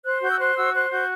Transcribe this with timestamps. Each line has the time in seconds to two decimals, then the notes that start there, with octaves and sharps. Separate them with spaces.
0.04 C5 F#6
0.22 F#4 G6
0.31 E6
0.39 C5 F#6
0.56 F#4 E6
0.74 C5 F#6
0.91 F#4 G6